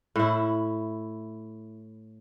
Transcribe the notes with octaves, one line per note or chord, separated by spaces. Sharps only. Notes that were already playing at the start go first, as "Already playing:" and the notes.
A2 E4